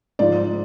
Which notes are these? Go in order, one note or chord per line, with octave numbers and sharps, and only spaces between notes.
G#2 F3 D5